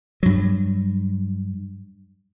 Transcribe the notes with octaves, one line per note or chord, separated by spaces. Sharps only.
G2 F#3